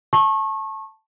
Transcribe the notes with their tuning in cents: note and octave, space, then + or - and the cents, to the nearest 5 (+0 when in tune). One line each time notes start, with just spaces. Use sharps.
A5 +0 C#6 -30